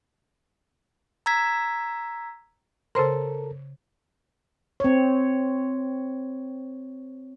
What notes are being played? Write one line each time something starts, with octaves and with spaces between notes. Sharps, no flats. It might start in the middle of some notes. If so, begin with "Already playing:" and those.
A#5 E6 G#6 B6
C#3 A4 A#4 C5 C6
C4 C#5